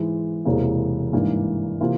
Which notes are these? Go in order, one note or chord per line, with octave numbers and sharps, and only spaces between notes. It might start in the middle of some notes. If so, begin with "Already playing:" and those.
Already playing: G#2 E3 G#3
E1 E2 C3 E3 A#3
G#1 G2 E3 A#3
C3 E3 A#3 F4